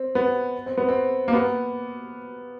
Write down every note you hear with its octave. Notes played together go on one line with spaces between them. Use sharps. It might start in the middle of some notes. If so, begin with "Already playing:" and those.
Already playing: C4
B3
C4
B3
C4
A#3
B3